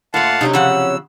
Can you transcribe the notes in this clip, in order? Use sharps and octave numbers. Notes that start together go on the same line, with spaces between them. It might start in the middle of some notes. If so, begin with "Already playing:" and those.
A#2 A3 F5 F#5 A5
C3 F#3 C#4 D#4
C#3 F3 F#5 E6